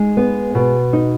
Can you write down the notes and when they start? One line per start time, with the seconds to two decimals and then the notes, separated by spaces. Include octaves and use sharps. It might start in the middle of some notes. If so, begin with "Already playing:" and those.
Already playing: G#3 D#4
0.17 B3
0.55 B2
0.93 D#4